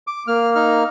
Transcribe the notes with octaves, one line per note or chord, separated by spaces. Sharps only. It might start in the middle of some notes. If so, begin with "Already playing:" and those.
D6
A#3 F6
D#4 F6